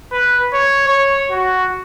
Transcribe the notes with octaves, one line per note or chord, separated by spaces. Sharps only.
B4
C#5
C#5
F#4